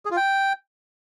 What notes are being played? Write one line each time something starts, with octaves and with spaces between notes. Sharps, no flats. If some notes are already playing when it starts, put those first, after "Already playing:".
G#4
F4
G5